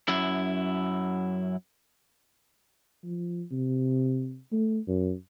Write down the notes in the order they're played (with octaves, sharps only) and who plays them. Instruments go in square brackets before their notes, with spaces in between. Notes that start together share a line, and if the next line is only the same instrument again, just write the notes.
[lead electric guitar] F#2 E4
[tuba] F3
C3
A3
F#2